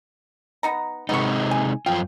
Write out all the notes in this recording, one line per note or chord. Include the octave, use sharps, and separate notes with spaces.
B3 D#4 A#5
C3 G#3 B3 D#4 C#6
G#5
F#2 F3 F4 G5